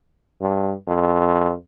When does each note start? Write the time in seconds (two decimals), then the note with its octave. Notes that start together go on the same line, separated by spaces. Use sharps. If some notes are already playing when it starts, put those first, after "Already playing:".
0.41 G2
0.88 F2